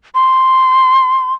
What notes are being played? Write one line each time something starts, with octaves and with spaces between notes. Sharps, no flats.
C6